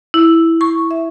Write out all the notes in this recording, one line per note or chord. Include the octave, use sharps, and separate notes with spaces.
E4
C#6
E5